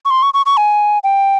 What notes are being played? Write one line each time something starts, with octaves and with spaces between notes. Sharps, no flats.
C#6
C6
C#6
C#6
C#6
G#5
G5